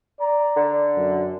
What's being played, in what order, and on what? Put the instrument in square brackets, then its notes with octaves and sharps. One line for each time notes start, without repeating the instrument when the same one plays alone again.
[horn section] D5 A#5
[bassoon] D3
[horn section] F#2